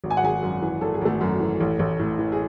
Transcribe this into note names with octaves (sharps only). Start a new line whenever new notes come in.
G#1
G#5
F#5
G#1 G#4 G#5
F#2
E3
G#1 A4
G#4
G#1 A3 A4
F#2
E3
A1
A1
A2
E3
G#4